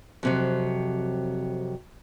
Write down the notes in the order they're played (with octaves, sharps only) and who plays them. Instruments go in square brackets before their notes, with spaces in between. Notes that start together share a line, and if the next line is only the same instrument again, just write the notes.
[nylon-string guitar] F2 C3 F#3